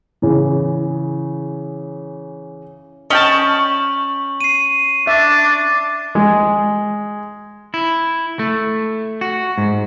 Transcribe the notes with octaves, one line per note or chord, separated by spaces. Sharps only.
C#3 E3
C#4 D#5 G5 A5 C#6 F#7
C7 D#7
D4 E5
G#3
E4
A3
F#4
G#2